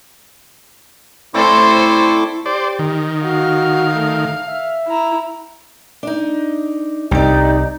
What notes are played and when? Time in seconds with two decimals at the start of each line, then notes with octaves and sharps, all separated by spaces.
1.34 A2 C4 E4 A4 C5 D5 C#6 D6
2.46 G4 C5 D5
2.79 D#3
3.24 F#4 F5
3.95 A3
4.47 E5
4.88 E4 A#5
6.03 D4 D#4
7.11 C2 D#4 G4 D5